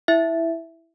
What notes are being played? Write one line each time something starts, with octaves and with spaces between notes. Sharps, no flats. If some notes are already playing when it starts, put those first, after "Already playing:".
E4 E5